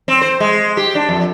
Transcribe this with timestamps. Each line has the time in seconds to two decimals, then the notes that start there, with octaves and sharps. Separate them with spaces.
0.08 C4
0.22 C5
0.40 G#3
0.77 G4
0.95 D4
1.09 F2